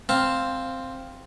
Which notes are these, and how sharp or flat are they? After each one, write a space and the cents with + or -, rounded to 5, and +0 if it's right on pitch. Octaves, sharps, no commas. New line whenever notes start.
C4 +0 F5 +0 A5 +0